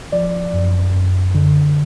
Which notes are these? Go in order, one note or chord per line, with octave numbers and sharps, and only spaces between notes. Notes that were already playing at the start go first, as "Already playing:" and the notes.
F3 D5
F#2
F#2
D3